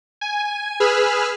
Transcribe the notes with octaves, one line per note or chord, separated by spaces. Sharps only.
G#5
G#4 B4 B5 E6 F6